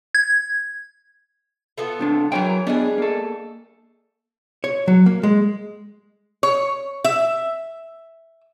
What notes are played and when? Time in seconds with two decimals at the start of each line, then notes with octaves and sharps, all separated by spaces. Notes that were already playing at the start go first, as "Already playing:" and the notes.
0.15 G#6
1.78 B3 F4 A4
1.99 C2 C4 D4
2.32 E3 F#3 A#4 C#5 G5
2.67 G3 G#3 B3 D4 G#4
2.98 A#3 A4
4.64 C#5
4.88 F#3
5.06 A#3
5.23 G#3
6.43 C#5
7.04 E5